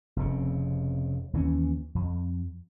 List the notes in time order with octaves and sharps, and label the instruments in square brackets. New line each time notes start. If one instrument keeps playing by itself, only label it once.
[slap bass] F1 F2 C#3
D#2 E3 C4 C#4
F2